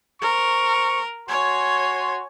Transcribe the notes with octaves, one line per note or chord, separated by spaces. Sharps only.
A#4 C5 C#6
F#4 C#5 G#5 C6